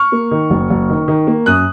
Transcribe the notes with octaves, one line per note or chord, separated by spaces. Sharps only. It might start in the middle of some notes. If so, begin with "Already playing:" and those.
Already playing: C#6 F6
A#3
D#3
F#1
F#1
D#3
D#3
A#3
F#2 D#6 F#6